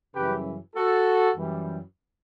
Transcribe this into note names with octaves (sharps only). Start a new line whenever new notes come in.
F#2 C#3 E3 G3 G4 B4
F#4 A4
F#2 E3 G3